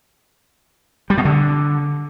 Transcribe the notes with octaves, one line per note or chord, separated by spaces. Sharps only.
G3
B2
D3